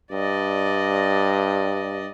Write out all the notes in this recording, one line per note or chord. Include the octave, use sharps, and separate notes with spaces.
G2 D5 D#5